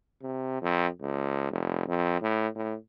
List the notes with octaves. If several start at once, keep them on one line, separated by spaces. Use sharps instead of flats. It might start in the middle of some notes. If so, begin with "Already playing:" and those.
C3
F2
C#2
F1
F2
A2
A2